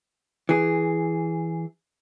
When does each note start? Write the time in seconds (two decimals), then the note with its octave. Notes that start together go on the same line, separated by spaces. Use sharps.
0.49 E3 G#4